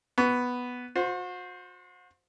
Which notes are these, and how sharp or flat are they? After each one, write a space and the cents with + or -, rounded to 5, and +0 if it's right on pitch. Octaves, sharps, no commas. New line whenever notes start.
B3 +0 C#6 +30
F#4 -40 C5 +0